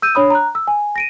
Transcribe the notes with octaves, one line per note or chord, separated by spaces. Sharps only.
E6 G6 D#7
D4 C#5 B5 D#6
A#5 F#6
E6
G#5
A#6 D7 D#7